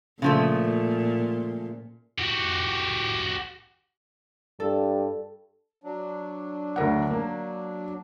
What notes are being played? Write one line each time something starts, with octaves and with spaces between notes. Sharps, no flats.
A#2 C#3 F3 A3
F#4 G4
G2 A4
F#3 D4
D2 A#4 F#5
A#3